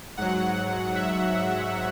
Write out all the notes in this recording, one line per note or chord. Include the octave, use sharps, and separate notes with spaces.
G#2 F#3 F#5
E5